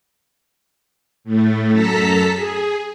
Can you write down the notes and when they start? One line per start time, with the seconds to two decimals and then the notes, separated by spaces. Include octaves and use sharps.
1.24 A2 A3
1.72 F#2 A4 A5 A#5 B6
2.33 G#4